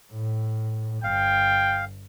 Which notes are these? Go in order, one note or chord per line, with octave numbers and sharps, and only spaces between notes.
A2
G1 F5 G5